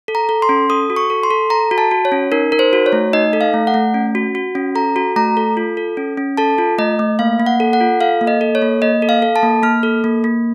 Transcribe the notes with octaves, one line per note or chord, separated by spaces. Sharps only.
A4
A#5
A4
C6
C#4
A4 D#6
F#4
C#6
A4
C6
A4
A4 A#5
F#4
A5
F#4
C#5
C#4
D#4 A#4
D#4 A#4
C5
F#4
C#5
A3
D#4 D#5
A4
F5
A3
F#5
A3
C#4
F#4
F#4
C#4
A4 A#5
F#4
A3 A#5
A4
F4
A4
C#4
C#4
A4 A5
F4
A3 D#5
A3
A#3 F5
A#3
F#5
A4
F#5
F4
A4 F5
A#3
D#5
A4
C#5
A#3
A#3 D#5
A4
F5
A4
A5
A#3
A#3 F6
A4
A#3
A#3